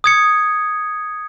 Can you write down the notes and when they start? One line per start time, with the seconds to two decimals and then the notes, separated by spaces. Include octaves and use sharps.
0.04 D#6 G#6 C#7